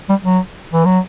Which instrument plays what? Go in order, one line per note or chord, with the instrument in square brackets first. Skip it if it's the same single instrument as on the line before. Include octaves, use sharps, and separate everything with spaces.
[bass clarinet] G3
F#3
E3
F#3